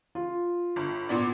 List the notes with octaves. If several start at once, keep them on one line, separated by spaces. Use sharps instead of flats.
F4
G1
A#2 B3 D5